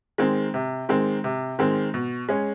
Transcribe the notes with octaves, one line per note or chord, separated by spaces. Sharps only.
D#3 G#3 C4
C3
D#3 G#3 C4
C3
D#3 G#3 C4
B2
G#3 C#4